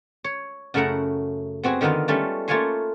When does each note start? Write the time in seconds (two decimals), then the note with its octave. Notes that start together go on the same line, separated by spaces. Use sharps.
0.24 C#5
0.74 F#2 C#3 A3 E4 F#5 A#5
1.63 B3 C4 F#4 G#4
1.81 D3 D#3 B3 D#4 F4
2.08 G3 A3 C#4 F4
2.48 A3 A#3 F4 C#5 G#5 C6